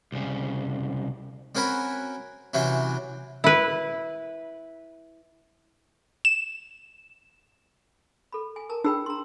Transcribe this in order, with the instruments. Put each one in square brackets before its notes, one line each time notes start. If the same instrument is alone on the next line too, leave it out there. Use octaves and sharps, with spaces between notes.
[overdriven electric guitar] C2 C#3
[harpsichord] C4 C#4 F#4 A#4 G#5 B5
C3 E3 F#3 C4 C#4
[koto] E4 B4
[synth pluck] E7
[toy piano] A4 B5
G#5
A#4 A5 A#5
[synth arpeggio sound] D4 G#4 [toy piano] G5 B5 E6
[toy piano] A#5 C6